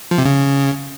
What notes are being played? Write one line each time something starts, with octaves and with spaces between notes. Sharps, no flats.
F3
C3
C#3